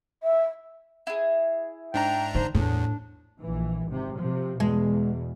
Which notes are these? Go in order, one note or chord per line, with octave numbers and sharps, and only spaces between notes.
E5
E4 G#4
G#2 D4 G5 A#5
D#3 C5
E2 A2 D4
A#1 E3
G#1 C3
C3 F3
E2 B2 G#3